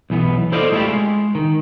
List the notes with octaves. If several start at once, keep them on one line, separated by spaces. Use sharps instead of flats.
B1 E3 B3
E4 A4 C5 D5 D#5 F5
G#3 A3 D4 E4 F4 G4
G#3
D#3